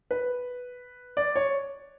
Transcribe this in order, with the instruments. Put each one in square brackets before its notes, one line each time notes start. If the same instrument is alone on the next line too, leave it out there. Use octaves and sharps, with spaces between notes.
[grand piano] B4
D5
C#5